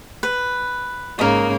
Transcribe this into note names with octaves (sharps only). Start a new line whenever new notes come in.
B4
G#2 C#3 A#3 A#4 D#5